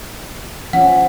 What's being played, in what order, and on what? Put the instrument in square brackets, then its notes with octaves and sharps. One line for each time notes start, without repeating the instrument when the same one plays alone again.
[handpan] F3 C#4 [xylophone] F#5